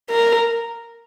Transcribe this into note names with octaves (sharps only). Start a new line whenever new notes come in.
A#4